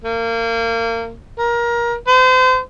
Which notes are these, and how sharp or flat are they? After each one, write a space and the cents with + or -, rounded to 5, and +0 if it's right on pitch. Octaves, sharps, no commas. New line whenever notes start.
A#3 -30
A#4 +25
C5 -35